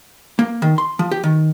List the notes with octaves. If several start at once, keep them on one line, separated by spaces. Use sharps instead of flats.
A#3
D#3
C6
F3
G4
D#3